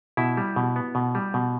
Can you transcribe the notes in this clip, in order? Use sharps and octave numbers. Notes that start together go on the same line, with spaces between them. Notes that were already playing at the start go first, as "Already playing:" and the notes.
B2 E4 E5
G3
B2
B3
B2
G3
B2